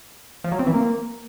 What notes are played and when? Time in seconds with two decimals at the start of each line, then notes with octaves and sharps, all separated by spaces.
0.44 F3
0.52 F#3
0.59 C4
0.67 E3
0.74 A#3